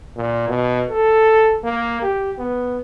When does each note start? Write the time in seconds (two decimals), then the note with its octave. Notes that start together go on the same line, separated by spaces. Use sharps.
0.16 A#2
0.48 B2
0.90 A4
1.64 A#3
2.02 G4
2.39 B3